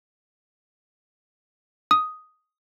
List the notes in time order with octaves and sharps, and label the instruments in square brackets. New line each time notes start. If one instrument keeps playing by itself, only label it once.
[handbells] D#6